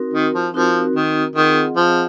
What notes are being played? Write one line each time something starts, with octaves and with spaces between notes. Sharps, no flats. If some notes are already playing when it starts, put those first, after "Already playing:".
Already playing: C4 D#4 F#4 A#4
D#3
F3
F3 C4 D#4 F#4 A#4
D#3
D#3 C4 F4 G#4 D#5 F#5
F3